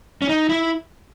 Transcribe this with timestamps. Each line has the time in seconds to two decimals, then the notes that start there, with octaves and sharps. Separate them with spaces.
0.22 C#4
0.29 D#4
0.49 E4